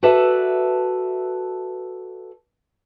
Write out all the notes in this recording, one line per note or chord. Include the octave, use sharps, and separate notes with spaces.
F#4 A4 B4 D5 E5 A5